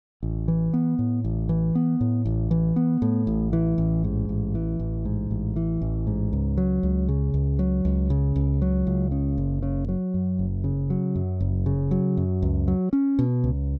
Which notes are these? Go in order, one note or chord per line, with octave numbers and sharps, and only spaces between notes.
A1
E3
B3
A2
A1
E3
B3
A2
A1
E3
B3
A2
A1
E3
A1
G#2
A1
E3
A1
G#2
A1
E3
A1
G#2
C#2
F#3
C#2
C#3
C#2
F#3
C#2
C#3
C#2
F#3
C#2
C#3
F#1
C#3
F#3
F#2
F#1
C#3
F#3
F#2
F#1
C#3
F#3
F#2
C#2
F#3
C#4
B2
C#2